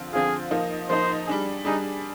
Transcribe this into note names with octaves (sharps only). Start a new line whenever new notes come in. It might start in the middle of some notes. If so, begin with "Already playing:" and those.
Already playing: D3 F3 C4 F4
D3 F3 C4 F4 G#4
F3 A#3 D#4
F3 A#3 D#4 C5
G3 D4 G#4
G3 D4 D#4 G#4